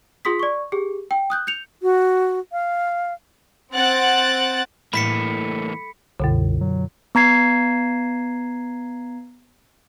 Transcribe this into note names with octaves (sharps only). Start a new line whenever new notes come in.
F4 G#4 C6 D#6 B6
D5 C#6
G4 G#4
G5
D#6 F#6 G6
G6 C#7 F7
F#4
F5
C4 F#5 F#6 A6 D7
A2 E3 A#3 B5 B6 C#7
C2 F#2 B2 D3
F#3
B3 A#5 G#6 C7